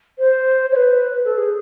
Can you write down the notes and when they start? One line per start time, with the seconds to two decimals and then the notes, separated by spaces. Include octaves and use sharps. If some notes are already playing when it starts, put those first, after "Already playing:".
0.19 C5
0.71 C#5
0.75 B4
1.24 A4
1.37 G#4